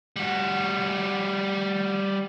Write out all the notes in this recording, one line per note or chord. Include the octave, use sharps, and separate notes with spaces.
G3 F#4